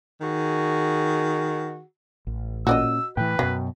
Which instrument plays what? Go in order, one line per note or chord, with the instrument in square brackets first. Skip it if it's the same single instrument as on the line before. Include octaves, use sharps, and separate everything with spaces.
[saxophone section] D#3 F#4 G#4
[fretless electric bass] A1
[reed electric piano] A#2 C#4 [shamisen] F#4 D5 D#5 [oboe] E6
[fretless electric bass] A2 E3 [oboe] B4 [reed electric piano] G5
[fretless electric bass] F#2 B2 [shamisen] F#3